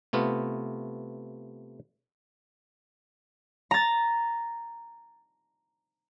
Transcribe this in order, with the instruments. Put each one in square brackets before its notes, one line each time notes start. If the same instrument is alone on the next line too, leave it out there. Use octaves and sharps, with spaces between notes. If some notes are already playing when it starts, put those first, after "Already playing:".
[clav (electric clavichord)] C3 A3 B3 F4
[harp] A#5 A6